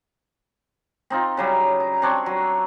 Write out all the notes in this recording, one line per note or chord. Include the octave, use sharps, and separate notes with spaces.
C4 D#4 F4
C#3 F#3 G3
A#5
C4 D4 C#5
F#3